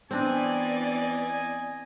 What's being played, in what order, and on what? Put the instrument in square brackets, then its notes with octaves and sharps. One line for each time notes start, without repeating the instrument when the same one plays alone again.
[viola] E3 D5 [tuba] B3 [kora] C4 D4 [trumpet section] D#5 G#5